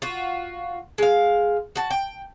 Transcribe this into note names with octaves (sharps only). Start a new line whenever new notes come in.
F4 F#4
G#3 F5
F#4 A5
G5